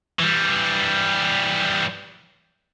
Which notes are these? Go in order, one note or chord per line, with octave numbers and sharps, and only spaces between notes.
E3 G3